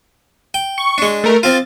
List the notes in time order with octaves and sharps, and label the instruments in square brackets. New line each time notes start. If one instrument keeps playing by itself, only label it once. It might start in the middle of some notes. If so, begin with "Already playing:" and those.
[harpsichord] G5
[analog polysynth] C#6
[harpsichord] G#3 D4
[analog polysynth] A3 A#4
[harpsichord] F3 C4 F4 [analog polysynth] A6